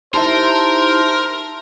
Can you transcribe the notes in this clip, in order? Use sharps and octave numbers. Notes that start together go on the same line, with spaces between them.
D#4 E4 G4 A#4 C5 E5 A5 C6